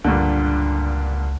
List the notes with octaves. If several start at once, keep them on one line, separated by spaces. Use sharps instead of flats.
C#2 G2 A#2 D3